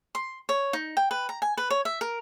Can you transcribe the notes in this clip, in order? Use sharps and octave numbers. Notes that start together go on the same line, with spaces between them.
C6
C#5
D#4
G5
B4
A#5
G#5
B4
C#5
E5
A#4